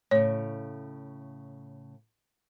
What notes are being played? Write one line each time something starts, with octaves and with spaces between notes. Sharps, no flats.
A2 C#3 C#5